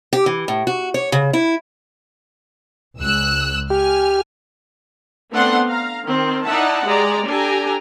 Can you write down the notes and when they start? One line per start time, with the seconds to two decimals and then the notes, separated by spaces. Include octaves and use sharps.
0.13 G4
0.26 E3
0.48 A2
0.67 F#4
0.94 C#5
1.12 C#3
1.33 E4
2.99 C#2 E6 F#6
3.70 G4 G#5 F6
5.32 A3 B3 C4 D4 F#5 C6
5.67 F5 A#5
6.05 D#3 C4
6.44 D#4 E4 D5 E5 F#5 A5
6.86 G#3 G4 D5 A#5
7.27 D4 G4 A4 G#5 A#5